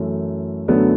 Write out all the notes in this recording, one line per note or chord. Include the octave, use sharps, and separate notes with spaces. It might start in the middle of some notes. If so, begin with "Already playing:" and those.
Already playing: F#2 E3 A3
F#2 D3 F#3 A3 B3